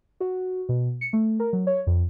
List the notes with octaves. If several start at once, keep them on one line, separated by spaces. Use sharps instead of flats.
F#4
B2
C#7
A3
A#4
F#3
C#5
F2